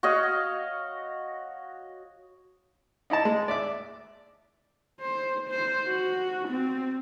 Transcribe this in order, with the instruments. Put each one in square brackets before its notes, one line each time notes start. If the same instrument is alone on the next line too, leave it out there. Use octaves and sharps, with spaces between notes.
[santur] F#4 C#5 D#5 F5
[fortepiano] D#4 E4 D#5 A5
G#3
D5 E5 D6
[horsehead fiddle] C5
C5
F#4
C4